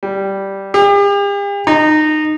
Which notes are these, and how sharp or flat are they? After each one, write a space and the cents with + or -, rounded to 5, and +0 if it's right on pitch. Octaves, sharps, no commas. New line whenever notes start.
G3 -5
G4 +45
D#4 -20